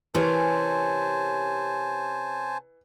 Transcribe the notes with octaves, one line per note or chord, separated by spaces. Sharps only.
C3 E3 C#4 A#4 C5 G#5 A5